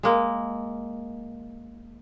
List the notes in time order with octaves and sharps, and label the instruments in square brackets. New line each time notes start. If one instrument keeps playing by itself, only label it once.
[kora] G#3 A#3